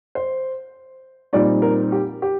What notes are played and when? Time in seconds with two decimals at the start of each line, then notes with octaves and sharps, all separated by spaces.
0.15 C5
1.33 A#2 G3 C4 D#4 D5
1.62 A#4
1.92 G4
2.22 G4